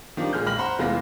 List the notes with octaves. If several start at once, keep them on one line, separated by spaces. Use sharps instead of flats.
D#3 F3 G3 D4
A#2 G#3 G#4 F6 G6
B1 B5 F6 A#6 F#7
C5 F#5 A#5 B5
F1 E2 G#3 F4 B5 A#6